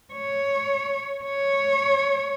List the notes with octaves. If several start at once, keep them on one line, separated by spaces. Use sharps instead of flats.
C#5
C#5